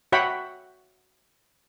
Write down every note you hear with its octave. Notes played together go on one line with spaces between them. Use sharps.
F#4 C#5 E5 F#5 G5 B5